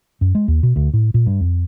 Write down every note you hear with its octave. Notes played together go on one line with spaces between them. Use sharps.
F#2
G#3
D#2
B2
D2
A2
A#2
G2
F2